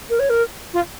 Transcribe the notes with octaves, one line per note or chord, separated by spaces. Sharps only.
A#4
C#5
A#4
F4